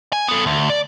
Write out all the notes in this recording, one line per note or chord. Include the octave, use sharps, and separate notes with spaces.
G#5
B3 A4
D2
D5